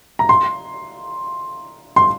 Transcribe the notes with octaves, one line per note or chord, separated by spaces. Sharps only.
A#5
C6
C6